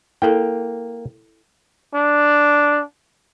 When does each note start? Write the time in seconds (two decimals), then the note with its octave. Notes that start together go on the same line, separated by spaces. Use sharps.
0.22 A#3 E4 A4 G5
1.94 D4